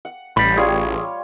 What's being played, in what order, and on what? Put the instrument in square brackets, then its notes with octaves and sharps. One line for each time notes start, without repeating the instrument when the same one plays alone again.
[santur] F#5
[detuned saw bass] A1 [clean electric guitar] G3 B5
[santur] G3 F4 C#5 [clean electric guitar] G#4